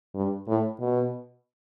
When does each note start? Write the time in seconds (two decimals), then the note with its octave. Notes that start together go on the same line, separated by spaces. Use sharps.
0.15 G2
0.48 A2
0.80 B2